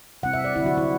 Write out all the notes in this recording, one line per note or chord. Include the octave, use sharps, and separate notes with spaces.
C3 G3 C4 E4 F#5
E5
D5
D3 F#3 C4 E4
F#4
E4